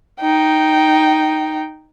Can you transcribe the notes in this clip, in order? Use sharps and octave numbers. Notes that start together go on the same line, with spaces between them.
D#4 G5